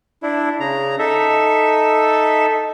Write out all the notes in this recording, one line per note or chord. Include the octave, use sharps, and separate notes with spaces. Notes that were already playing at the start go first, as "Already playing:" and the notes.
D4 E4
C#3 A#5
D#4 A4 E5